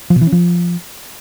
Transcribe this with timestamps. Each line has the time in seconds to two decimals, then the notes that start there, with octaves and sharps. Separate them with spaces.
0.10 F3
0.16 B2
0.21 E3
0.27 C#4
0.32 F3